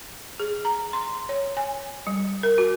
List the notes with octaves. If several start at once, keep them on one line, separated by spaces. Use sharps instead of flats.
G#4
A#5
C6
C#5
G#5
G3
A#4
F#4